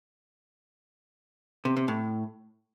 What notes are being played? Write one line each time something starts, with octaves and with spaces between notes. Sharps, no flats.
C3
C3
A2